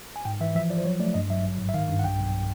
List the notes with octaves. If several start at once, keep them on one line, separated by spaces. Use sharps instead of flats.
G#5
G#2 G5
E3 E5
F3 E5
F3 D5
C5
F#3 C#5
A3 D5
G2 D#5
F#3 E5
G#1
G#2
E5
D#3 F5
G2
F#5
B1 G5
B1